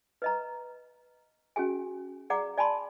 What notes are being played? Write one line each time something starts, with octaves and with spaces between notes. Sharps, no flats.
B4 D#5 A#5
C#4 F#4 G#4 G#5
G#4 D5 F#5 A#5 D6
D5 G#5 A5 B5 C6